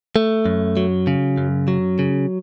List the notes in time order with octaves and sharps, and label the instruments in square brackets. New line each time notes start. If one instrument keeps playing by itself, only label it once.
[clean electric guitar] A3
F#2
F#3
C#3
F#2
F#3
C#3